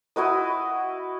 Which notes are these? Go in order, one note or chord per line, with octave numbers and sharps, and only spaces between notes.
E4 F#4 B4 D#5